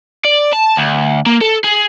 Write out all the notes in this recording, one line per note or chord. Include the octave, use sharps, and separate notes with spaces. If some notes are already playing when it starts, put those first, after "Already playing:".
D5
A5
D2
A#3
A4
G#4